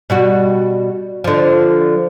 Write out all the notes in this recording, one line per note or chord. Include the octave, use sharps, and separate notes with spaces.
B2 G3 F#4
D3 F3